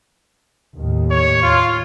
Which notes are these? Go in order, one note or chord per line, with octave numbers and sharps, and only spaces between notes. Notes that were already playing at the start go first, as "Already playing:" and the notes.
D#2 A2 D#3
C#5
F4